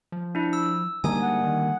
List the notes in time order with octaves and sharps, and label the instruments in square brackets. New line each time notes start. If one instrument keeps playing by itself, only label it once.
[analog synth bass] F3
[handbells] D4 E4
E6
[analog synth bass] G#2 [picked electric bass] D3 G3 A#3 [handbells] G#5 D#6
[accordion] F#5
[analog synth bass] D#3